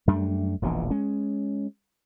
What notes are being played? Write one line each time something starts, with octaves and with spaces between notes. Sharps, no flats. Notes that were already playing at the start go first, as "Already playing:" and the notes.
F#2 G3 A3 D4
E1 A#1 B2 E3
G#3 C#4